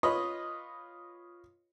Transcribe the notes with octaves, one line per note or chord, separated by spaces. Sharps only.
F4 B4 C#5 D#5